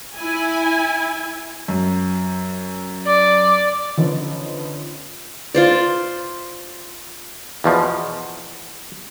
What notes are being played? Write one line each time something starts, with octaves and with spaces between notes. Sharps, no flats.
E4 G#5
F#2
D5
D3 F3 B3 C#4 D#4
F4 C5 D5
E2 B2 F3